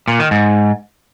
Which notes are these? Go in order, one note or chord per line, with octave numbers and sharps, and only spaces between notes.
A#2
D#3
G#2